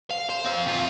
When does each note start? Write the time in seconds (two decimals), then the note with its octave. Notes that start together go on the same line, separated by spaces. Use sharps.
0.11 F5
0.29 C5
0.45 C4 F5
0.66 C3 F4